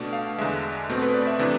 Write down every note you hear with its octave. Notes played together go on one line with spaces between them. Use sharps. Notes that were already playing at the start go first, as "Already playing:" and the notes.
Already playing: B2 A3 D4
F5
E2 D3 G#3 E5
B2 A3 C4
B4
D5
E5
C3 E3 A3 D4